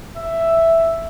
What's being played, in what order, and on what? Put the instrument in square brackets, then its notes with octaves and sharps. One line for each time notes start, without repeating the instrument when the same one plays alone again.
[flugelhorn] E5